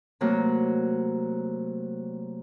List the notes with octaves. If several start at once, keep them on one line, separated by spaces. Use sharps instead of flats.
C3 F#3 A3 A#3